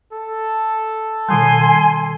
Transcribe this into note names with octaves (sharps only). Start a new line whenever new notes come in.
A4
B2 D#3 G3 G#5 C6